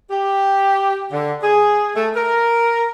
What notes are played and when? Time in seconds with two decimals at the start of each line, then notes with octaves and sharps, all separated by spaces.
0.11 G4
1.12 D3
1.42 G#4
1.96 A3
2.16 A#4